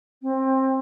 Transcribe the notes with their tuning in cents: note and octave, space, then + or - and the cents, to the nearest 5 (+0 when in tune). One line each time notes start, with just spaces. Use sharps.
C4 +20